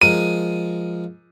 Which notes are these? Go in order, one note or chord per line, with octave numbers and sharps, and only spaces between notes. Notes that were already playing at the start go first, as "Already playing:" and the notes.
F3 G#3 A#4 D#7